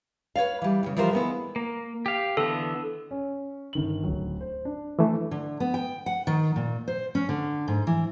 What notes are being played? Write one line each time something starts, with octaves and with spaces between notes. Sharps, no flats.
B4 C#5 D5 F5
E3 G3
E2 C#3
E3 F3 G3 F4 A#4 C5
G#3 B3 E4
A#3
G4 F5
D3 E3 B3 A4
C#4
G1 D#3 F#7
D1 F#3
C5
D4
E3 A3
D3
B3
G5
F#5
D#3
A#2
C5
C#4
D3
G#2
E3